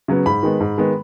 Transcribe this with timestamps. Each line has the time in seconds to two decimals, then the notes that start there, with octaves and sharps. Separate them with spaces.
0.08 C#3 F#3 B3
0.26 G#2 B5
0.43 D#3 G#3 B3
0.60 G#2
0.78 D#3 G#3 B3